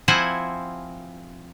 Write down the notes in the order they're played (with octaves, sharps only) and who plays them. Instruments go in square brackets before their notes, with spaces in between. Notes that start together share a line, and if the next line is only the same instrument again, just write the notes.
[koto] F3 C4 E4 C5 F#5 G#5